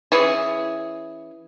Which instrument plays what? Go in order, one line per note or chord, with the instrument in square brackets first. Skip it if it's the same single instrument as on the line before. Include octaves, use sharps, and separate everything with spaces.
[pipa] E3 C#4 G#4